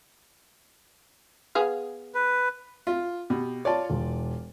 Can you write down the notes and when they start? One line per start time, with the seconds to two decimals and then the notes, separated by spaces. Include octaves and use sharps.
1.55 B3 G#4 F5
2.15 B4
2.87 F4
3.30 B2 G4
3.65 F4 C#5 D5 A5
3.90 E1